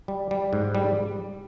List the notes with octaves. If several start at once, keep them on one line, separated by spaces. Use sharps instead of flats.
G3
G3
G#2
G3